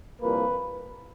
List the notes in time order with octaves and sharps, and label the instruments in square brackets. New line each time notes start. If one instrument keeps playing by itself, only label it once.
[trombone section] C2 A#2 F3 A#3 B4